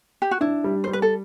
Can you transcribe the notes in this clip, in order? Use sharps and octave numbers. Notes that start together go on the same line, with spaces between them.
G4
F#4
D4 E4
G3
G3 C5
B4
A4